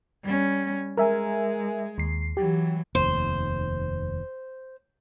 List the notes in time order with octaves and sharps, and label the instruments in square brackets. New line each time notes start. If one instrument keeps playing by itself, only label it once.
[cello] G3 C#4
[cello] G#3 [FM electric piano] A#4 E5 G#5
[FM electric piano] D#2 C7
[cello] E3 F#3 [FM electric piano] G4
[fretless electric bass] F1 D#2 [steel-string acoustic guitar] C5